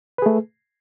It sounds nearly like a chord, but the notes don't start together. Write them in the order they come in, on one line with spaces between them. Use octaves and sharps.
B4 G#4 A3